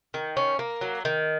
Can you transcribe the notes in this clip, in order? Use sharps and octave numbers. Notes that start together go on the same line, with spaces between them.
D#3
C#4
A#3
F#3
D#3